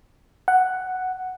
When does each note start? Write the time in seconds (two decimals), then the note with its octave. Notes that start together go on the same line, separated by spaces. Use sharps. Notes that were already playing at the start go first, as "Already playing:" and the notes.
0.48 F#5